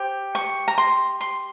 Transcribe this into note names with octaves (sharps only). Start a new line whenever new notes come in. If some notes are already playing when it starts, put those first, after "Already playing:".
Already playing: G4 C5
C#6
A#5
C6
C6